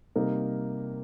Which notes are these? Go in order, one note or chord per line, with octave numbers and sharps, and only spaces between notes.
C3 G3 A#3 D#4 A#4